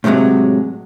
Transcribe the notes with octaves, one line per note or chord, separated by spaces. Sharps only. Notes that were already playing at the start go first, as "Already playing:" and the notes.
A2 C3 E3 F#3 G#3